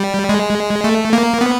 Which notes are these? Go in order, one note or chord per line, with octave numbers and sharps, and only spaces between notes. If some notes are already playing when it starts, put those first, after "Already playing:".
Already playing: G3
G#3
A3
A#3
B3